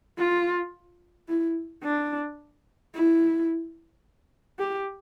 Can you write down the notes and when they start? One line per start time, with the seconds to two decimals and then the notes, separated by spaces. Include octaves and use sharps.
0.19 F4
1.28 E4
1.83 D4
2.94 E4
4.59 G4